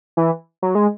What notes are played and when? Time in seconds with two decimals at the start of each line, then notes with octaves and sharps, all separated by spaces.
0.17 E3
0.62 F#3
0.75 G#3